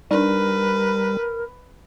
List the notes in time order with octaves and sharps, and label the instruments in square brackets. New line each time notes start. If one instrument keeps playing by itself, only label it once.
[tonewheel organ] G3 [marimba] D4 D#4 [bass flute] A#4 [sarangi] B4